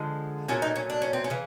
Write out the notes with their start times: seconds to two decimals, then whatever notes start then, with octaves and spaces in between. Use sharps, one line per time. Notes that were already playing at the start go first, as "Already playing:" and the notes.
Already playing: D3 F3 G#3
0.48 A#2 F#3 A3 C#4
0.62 D#4
0.76 C#4
0.90 D4
1.02 C#4
1.13 C4
1.24 C#4
1.30 C#3 E3